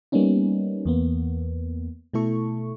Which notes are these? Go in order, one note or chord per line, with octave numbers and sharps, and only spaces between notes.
G3 A#3 B3 C#4 D#4
E2 A#3 B3
B2 A3 E4 A4 C#6